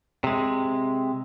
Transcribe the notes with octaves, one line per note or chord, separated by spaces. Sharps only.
C3 G#3